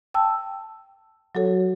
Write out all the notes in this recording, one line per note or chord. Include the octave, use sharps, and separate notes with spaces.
G5 A5 E6
F#3 F#4 A4 C#5